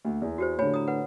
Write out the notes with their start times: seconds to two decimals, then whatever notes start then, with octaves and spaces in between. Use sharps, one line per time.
0.05 D2
0.22 E2
0.38 F#4 G4 C5
0.59 A2 D3 C#5 G#5 B5
0.74 A#5 D#6
0.88 B4 F#5